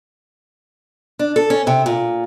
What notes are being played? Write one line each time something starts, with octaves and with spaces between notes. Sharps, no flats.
D4
A4
C#4
C3
A#2